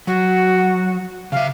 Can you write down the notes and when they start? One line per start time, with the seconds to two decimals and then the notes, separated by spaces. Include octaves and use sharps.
0.07 F#3 F#4
1.32 C#3 E5 F5